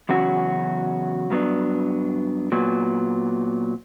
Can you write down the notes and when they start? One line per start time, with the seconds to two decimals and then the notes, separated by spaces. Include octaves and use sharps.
0.09 E2 C#3 F#3 C#4 F#4
1.30 G2 F#3 B3 D4
2.52 A#2 F#3 B3